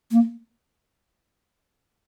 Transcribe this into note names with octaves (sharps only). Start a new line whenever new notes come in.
A#3